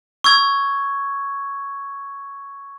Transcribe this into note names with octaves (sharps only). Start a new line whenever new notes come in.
C#6 E6 G#6